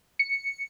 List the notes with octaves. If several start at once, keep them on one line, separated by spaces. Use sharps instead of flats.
C#7